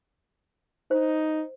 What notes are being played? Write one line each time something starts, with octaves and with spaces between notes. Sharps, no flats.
D#4 C5